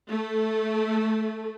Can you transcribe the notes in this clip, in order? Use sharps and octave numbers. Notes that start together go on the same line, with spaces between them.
A3